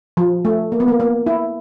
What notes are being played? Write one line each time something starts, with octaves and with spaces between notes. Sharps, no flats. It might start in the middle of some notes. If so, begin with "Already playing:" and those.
F3
A3
A#3
B3
A#3
A#3
E4